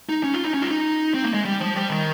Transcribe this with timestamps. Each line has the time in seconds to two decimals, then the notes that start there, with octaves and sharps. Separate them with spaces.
0.09 D#4
0.24 C#4
0.34 F4
0.43 D#4
0.54 C#4
0.62 F4
0.70 D#4
1.14 C4
1.24 A#3
1.34 G#3
1.45 G3
1.60 F3
1.75 G3
1.90 D#3